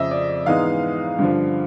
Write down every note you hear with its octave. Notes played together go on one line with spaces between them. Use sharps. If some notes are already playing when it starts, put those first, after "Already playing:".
Already playing: F2 C#3 F3 D#5 E5
D5
G#2 E3 G#3 B3 D#4 F5
G2 D3 F3